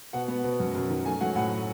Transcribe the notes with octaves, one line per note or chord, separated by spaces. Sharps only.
B2 F#5
B3
B2
F#2
F#2
D#3
A3 G#5
F#3 F#5
A2 F#5